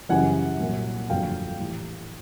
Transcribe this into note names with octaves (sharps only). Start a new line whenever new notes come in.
F#2 C#3 E3 G3 F#5 G#5
C2 A#2 F#3 A#3
G1 F2 D3 F#3 A#3 F5 G5
A2 E3 G3